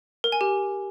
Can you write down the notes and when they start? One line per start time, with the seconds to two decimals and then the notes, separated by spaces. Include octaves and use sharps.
0.24 A#4
0.32 G#5
0.41 G4